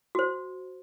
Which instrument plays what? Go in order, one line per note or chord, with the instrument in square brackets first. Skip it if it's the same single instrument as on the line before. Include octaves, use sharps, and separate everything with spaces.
[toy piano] F#4 C5